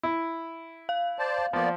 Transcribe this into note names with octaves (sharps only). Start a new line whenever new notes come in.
E4
F5
C5 D5 A5
F3 A#3 B3 D5